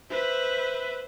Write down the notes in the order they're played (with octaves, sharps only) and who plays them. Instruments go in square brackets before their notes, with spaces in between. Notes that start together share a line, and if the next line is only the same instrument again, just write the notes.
[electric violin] B4 E5 [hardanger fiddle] C5